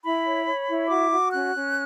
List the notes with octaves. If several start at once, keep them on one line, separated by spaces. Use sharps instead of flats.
E4 B5
C#5
C#5
E4
F#4 D6
F#4
C#4 F#6
C#4